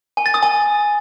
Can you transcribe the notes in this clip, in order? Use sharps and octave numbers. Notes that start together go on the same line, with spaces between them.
G#5
A6
D#6
G#5